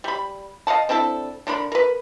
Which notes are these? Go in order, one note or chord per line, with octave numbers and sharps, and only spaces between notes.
G3 B5
D#5 F5 F#5 A5
C4 D4 E4 A4
D3 D4 A#4 B5
A#4 B4